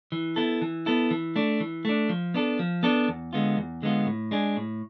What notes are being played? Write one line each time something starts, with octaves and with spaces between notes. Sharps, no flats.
E3
B3 E4 A4
E3
B3 E4 A4
E3
A3 D4
E3
A3 D4
F3
B3 D4 A4
F3
B3 D4 A4
E2
D3 G#3 B3 F4
E2
D3 G#3 B3 F4
A2
G#3 D4 G#4
A2